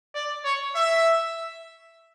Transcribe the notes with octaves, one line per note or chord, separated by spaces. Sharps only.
D5
C#5
E5